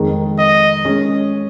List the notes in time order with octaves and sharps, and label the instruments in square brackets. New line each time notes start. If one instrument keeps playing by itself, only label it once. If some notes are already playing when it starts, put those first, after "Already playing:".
Already playing: [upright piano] F2 D#3 G#3
[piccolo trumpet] D#5
[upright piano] G#3 C#4